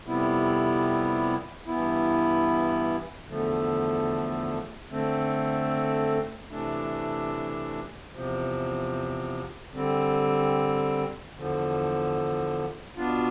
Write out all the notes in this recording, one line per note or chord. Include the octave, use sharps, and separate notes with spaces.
F2 C3 G3 B3 E4
G2 E3 B3 E4
E2 D3 F3 A3
D3 A3 C4
C3 E3 A3 D4
E2 C3 F3
D3 G3 C4
E2 D3 F3
B2 B3 D4 F4